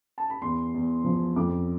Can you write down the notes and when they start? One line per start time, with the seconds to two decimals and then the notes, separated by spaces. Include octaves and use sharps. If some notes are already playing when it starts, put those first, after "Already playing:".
0.18 A5
0.30 B5
0.42 E2 C6
0.74 E2
1.04 F3
1.36 F2 D6